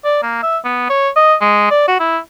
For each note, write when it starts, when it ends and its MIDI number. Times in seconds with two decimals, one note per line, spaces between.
0.04 0.19 74
0.23 0.42 58
0.43 0.58 76
0.65 0.88 59
0.90 1.09 73
1.16 1.35 75
1.41 1.66 56
1.70 1.84 74
1.88 1.96 66
2.00 2.18 64